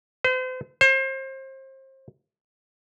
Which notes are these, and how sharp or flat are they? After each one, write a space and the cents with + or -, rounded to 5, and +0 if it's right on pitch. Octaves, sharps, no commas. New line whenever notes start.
C5 -40
C5 +30